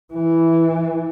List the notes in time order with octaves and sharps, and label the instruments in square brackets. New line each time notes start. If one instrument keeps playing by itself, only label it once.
[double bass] E3